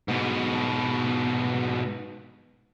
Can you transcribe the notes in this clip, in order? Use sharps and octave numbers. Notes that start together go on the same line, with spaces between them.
G#2 B2